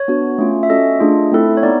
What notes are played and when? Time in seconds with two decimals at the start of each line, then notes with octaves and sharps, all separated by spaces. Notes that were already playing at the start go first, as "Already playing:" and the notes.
Already playing: C#5
0.08 B3 D4 F#4
0.38 A3 C#4 F4
0.63 E5
0.70 C#4 F#4 A4 D#5
1.00 A3 D4 F4 G#4
1.31 A3 C4 E4 A4
1.57 C#5
1.63 B3 D#4 D5